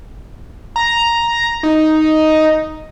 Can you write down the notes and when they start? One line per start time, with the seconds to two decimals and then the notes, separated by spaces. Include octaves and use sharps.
0.76 A#5
1.63 D#4